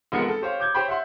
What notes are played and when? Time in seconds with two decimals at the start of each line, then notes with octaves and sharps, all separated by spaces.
0.12 F1 F3 G#3 B3 A#4 C#7
0.28 A4
0.42 G4 C5 C#5 F5
0.60 D6 G6 G#6
0.74 G4 C5 C#5 G5 B5 C6
0.88 E5 F#5 C6